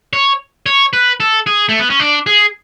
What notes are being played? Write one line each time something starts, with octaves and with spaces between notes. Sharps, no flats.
C#5
C#5
B4
A4
G#4
A3
B3
C#4
D4
G#4